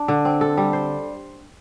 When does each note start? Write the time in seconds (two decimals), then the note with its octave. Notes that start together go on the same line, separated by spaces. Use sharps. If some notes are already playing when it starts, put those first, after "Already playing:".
Already playing: D4
0.08 D3
0.25 C4
0.41 A4
0.57 G3
0.73 C5